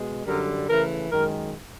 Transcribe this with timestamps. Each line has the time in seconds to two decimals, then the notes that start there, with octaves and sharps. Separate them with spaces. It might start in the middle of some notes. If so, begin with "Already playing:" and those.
Already playing: B2 G#3
0.25 F#2 D3 G3 A#4
0.68 C#3 E3 A3 A#4
1.11 F#2 D#3 G#3 A#4